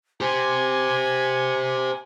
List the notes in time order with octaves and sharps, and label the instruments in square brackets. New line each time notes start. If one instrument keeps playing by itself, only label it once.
[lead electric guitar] G4 C5 [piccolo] G#5